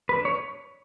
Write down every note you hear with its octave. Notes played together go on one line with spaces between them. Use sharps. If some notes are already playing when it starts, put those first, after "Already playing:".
B4
D4
C#5